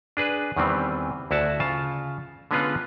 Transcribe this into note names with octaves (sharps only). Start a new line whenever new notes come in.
D4 G#4 B4
E2 D#3 E3 G3 C4
D2 E4 F#4 F#5 A5
C#3 F4 A5
D3 G#3 B3 C#4 F4 B4